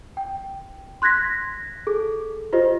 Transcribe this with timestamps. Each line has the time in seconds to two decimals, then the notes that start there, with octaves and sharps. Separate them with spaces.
0.17 G5
1.02 C6 F#6 G#6 A#6 B6
1.87 G#4 A4
2.53 F4 G4 C5 D#5